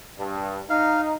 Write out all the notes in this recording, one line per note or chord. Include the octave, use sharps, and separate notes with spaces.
G2
D#4 F5